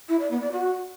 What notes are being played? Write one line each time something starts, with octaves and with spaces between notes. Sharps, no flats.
E4
D5
B3
D5
F#4